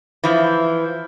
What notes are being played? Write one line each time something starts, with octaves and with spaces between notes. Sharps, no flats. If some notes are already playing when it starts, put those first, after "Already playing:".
E3 F3